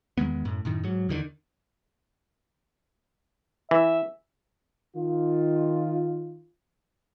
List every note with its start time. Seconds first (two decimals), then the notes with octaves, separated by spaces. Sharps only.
0.18 E2 D#3 G#3 B3
0.45 F#2 A2
0.65 F#2 A2 D#3
0.83 G#2 F#3
1.09 E2 D3 D#3
3.71 E3 E5
4.95 D#3 F4